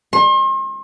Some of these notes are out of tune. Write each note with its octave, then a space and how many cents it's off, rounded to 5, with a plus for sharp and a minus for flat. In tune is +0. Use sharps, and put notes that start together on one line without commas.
C6 +40